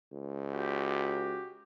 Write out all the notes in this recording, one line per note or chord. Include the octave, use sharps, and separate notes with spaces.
C#2
F#4 G4